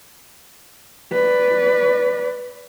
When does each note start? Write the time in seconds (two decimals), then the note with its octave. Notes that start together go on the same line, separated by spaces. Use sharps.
1.12 B4 D5